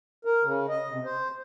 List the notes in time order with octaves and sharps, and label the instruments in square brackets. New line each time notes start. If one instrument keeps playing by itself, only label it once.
[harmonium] A#4
C#3
D#5
C3
C5